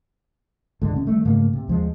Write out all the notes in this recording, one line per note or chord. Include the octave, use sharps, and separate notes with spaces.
D#1 A2 D3 G#3
C3 C#4
D#3 G3 A3
G#2 C#3 A3 A#3
C3
D#2 F3 G#3